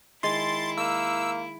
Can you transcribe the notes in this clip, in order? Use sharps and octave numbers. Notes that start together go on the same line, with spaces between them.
D#3 G#3 E4 G#5 C6 A6
A#3 E6